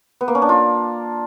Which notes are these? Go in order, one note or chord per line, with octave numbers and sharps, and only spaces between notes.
B3
A#3
C#4
D4
F4